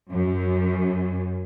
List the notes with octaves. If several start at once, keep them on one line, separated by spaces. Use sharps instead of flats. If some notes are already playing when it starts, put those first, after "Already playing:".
F#2